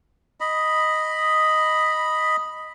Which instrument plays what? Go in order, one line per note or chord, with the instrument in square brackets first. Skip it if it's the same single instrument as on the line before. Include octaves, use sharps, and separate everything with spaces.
[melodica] D#5 B5